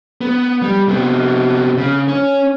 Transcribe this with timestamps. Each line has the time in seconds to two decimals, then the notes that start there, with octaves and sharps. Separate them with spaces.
0.21 B3
0.62 G3
0.88 C3 B3
1.77 C#3
2.08 C#4